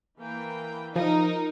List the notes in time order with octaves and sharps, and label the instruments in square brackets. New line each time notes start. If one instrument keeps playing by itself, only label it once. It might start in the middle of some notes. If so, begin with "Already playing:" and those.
[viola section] E3 A#3 G5
[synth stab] F3 [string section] D#4 [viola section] A#4